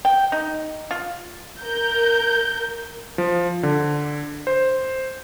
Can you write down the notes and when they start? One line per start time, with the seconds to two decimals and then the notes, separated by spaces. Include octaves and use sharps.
0.05 G5
0.32 D#4
0.91 F4
1.62 A#4 G6
3.18 F3
3.63 D3
4.47 C5